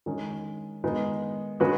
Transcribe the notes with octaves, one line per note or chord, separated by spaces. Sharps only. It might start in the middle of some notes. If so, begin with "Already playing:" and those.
D#3 G#3 C#4
D#3 G#3 B3 D#4
D#3 G#3 C#4 F#4 B4